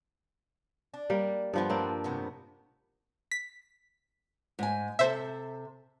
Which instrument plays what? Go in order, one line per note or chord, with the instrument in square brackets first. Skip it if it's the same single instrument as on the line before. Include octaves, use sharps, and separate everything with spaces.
[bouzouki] D4
[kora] G3 A#3
[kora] G2 F3 [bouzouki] B3 F4 B4
[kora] A#3 C4 D4
[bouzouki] A2 C3 B3
[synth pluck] B6
[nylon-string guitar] G#2 G#5
[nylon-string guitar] C3 A4 [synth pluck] C5 E5